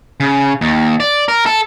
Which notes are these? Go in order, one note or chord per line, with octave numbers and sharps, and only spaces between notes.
C#3
D#2
D5
A#4
A4